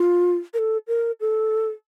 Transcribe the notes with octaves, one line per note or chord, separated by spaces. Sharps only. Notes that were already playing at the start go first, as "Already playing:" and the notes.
Already playing: F4
A#4
A4
A#4
A4